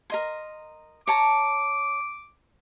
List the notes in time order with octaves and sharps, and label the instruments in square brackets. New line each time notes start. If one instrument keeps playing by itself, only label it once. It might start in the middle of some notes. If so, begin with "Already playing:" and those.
[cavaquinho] A#4 D#5 C6
[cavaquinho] C#5 A5 A#5 [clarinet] D6